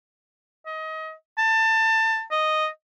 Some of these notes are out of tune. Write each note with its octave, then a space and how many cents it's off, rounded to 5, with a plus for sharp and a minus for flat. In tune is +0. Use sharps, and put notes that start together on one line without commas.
D#5 +25
A5 +20
D#5 -5